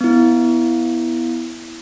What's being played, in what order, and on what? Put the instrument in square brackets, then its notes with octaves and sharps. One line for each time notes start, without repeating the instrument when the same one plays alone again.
[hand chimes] B3 E4